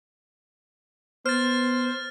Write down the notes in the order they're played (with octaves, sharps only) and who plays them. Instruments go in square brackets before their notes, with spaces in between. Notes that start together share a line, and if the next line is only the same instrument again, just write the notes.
[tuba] B3 [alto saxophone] C5 [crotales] F6 A6